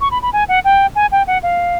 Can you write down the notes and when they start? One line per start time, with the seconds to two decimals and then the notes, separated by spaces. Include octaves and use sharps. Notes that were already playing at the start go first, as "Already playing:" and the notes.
0.01 C#6
0.11 B5
0.22 B5
0.33 G#5
0.48 F#5
0.64 G5
0.95 G#5
1.12 G5
1.27 F#5
1.43 F5